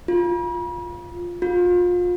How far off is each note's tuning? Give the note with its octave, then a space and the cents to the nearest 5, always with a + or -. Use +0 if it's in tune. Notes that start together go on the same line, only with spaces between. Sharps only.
F4 +5
F4 +30